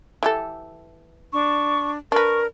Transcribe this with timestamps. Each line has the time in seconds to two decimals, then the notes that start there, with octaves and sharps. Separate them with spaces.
0.23 E3 G4 A4
1.33 D4 C#6
2.12 D4 A#4 B4 C#6